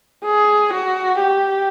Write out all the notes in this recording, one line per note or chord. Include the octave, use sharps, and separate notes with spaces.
G#4
F#4
G4